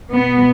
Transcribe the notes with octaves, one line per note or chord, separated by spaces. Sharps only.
B2 B3